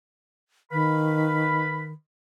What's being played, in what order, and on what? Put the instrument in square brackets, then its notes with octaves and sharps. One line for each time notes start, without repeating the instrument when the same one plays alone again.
[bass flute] D#3 [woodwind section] B4 F5 B5